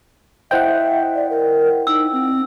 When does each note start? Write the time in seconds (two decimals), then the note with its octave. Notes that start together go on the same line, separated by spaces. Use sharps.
0.51 E4 C5 D#5 E5 F#5 G5
1.15 D5
1.30 A#4
1.87 D#4 E6
2.12 C4